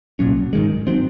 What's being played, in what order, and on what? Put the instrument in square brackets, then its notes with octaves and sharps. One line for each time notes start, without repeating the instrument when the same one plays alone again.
[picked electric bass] C2 A#2 F#3 C#4
G#2 D#3 G#3
D#3 F#3 C4